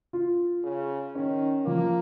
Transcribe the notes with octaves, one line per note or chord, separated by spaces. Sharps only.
F4
C#3
D#3 C#4
F3 A#3